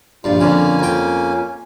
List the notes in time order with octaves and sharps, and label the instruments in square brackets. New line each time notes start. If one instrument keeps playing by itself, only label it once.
[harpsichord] A#1 G2 [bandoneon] F4
[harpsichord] F2 D3 [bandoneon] A#3 C#4 G#5
[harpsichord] F2 G5